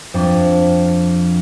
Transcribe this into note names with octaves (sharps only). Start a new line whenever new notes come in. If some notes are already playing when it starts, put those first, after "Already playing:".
F2 D4